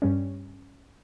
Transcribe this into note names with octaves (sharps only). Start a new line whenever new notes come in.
G2 G3 C#4